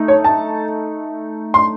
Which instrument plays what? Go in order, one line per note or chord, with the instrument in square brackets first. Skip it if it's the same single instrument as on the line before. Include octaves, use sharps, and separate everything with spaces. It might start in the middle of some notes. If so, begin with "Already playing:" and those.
Already playing: [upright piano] A3 D#4
C#5
A5
C6